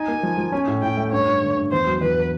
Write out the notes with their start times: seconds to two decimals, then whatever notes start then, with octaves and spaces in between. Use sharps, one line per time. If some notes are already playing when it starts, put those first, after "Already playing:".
Already playing: D#4 G#5
0.08 A#3
0.23 F3
0.38 F3
0.52 C#4
0.67 A2
0.82 A2 G5
0.97 A3
1.12 G2 C#5
1.28 G2
1.42 D3
1.56 G2
1.72 E2 C5
1.87 F#3
2.01 E2 B4